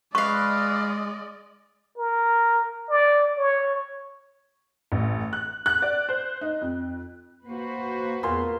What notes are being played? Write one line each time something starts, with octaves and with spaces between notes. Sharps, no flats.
G#3 B4 D5 D#5 F5 C#6
A#4
D5
C#5
A1
F#6
F#6
D5
C5
D#4
F2
A#3 F#4 B4 C5
E2 A#2 C6